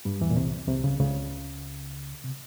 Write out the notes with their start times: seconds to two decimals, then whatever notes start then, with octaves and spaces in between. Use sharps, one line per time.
0.05 G2 G3
0.21 E2 E3
0.30 A#2
0.36 C2 C3
0.68 C2 C3
0.84 C#2 C#3
1.00 C#2 C#3
2.24 C3